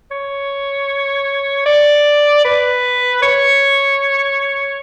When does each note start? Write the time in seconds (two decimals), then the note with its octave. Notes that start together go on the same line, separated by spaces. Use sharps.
0.11 C#5
1.66 D5
2.45 B4
3.22 C#5